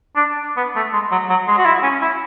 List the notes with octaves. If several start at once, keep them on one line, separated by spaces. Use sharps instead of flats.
D4
B3
A3
G#3
F#3
F#3
G#3
F#4
E4
C#4
E4